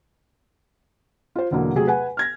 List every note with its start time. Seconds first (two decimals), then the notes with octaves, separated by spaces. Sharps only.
1.35 F4 C5
1.51 E2 B2 D3 F#3 A#3
1.75 C3 F#3 A3 G#4
1.87 B4 F#5 G#5
2.17 F6 G#6 A#6